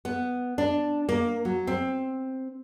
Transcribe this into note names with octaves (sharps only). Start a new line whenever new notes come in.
B3
D4
A#3
F#3
C4